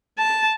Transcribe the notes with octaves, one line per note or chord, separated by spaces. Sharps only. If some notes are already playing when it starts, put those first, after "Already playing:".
A5